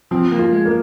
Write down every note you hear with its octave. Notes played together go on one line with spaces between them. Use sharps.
F3 C4
A#3
F4
G#3
A#3